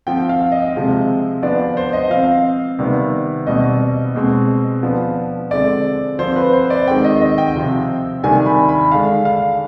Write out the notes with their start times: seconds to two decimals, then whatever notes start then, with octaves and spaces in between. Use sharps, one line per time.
0.07 F3 C4 G5
0.29 F5
0.52 D#5
0.75 C3 F3 G#3 C4
1.42 F3 B3 D4 D5
1.77 C5
1.93 D#5
2.10 F3 C4 F5
2.79 C3 D#3 G3 B3
3.47 B2 G3 C4 D#5
4.15 B2 G#3 C4
4.83 F3 B3 D4
5.51 D3 G#3 C4 D5
6.19 F3 C4 C5
6.36 B4
6.53 C5
6.70 D5
6.88 D#3 G#3 C4 G5
7.04 D#5
7.21 D#5
7.38 G5
7.56 C3 F3 C4
8.23 C3 D#3 G3 D4 G#5
8.46 B5
8.69 B5
8.92 D3 G#3 D4 F5
9.25 F5